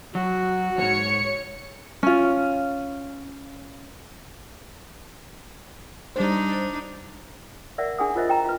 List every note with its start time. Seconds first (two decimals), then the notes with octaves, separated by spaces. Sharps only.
0.15 F#3 F#4
0.78 E2 G#2 C#5 C#7
2.03 C#4 F4
6.16 G3 D4 D#4 C5
7.78 A#4 D5 E5 F#5
7.98 D4 G#4 F#5 D#6
8.15 F4 A#4 C5 D#5 E5
8.29 G5 A#5
8.44 F4 B4